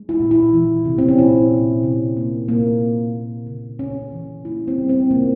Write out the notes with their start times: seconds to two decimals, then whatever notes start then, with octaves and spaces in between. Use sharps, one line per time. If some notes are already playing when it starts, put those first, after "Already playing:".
Already playing: G#3
0.09 E4
0.20 A#2
0.31 E4
0.53 E3
0.85 C3
0.98 C4
1.08 C#4
1.18 A#2 E4
1.52 A#2
1.83 C3
2.17 A#3
2.48 A#2 A#3
2.81 A#2
3.14 A#3
3.47 C#3
3.79 C#3 C#4
4.12 E3
4.45 A#3 E4
4.68 C4
4.78 G3
4.89 C4
5.11 C#3 A#3